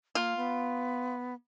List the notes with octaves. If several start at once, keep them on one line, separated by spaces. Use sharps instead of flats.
A#3 F4
B3